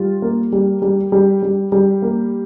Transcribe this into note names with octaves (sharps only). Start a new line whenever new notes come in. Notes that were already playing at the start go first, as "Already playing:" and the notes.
Already playing: G3 F4
A#3
G3
G3
G3
G3
G3
A#3